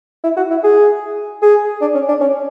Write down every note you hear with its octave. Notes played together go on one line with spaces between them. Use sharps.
E4
F#4
E4
G#4
G#4
D4
C#4
D4
C#4